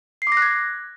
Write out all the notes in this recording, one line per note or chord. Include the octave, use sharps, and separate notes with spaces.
C7
D6
A#6
F#6
G#6